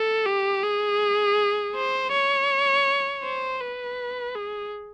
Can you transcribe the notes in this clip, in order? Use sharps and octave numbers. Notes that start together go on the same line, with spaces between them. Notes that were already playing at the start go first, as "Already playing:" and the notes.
Already playing: A4
G4
G#4
C5
C#5
C5
B4
G#4